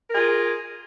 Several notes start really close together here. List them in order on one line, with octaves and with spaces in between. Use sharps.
A#4 G#4 F4